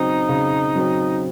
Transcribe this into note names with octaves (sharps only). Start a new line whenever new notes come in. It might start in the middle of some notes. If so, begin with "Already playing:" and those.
Already playing: C#3 F#3 C4 D#4
C#3
F#3 C4